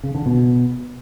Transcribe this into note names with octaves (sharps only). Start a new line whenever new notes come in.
C#3
D3
B2